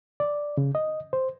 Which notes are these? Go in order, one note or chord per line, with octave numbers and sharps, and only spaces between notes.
D5
C#3
D#5
C5